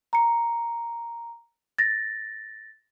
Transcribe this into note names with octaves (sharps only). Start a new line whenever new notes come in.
A#5 C#7
A6 A#6